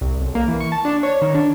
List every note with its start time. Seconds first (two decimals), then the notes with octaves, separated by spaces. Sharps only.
0.01 C2
0.21 B1
0.35 A#3
0.48 E3
0.60 C#6
0.72 A5
0.85 D4
1.03 C#5
1.22 D#3
1.35 D4